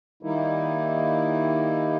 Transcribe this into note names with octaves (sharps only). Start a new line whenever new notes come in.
D#3 G3 A#3 D#4 E4